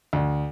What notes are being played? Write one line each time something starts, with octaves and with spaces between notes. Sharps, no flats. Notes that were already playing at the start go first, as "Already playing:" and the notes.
D2